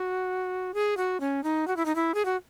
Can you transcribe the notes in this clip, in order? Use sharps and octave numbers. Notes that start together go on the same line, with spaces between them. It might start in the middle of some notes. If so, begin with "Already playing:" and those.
Already playing: F#4
G#4
F#4
C#4
D#4
F#4
E4
D#4
E4
G#4
F#4